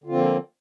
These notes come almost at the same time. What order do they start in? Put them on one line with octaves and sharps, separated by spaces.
D3 F4 C4 F3 A#3